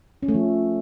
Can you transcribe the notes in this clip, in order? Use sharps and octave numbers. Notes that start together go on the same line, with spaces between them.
C#4
A3
F3